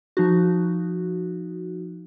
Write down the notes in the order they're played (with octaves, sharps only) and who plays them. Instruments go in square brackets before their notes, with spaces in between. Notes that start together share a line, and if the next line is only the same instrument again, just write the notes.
[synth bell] F3 D#4 F#4